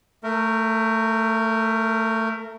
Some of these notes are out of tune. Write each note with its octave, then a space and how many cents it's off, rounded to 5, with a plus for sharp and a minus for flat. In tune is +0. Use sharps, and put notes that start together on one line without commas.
A3 +15 A#4 -15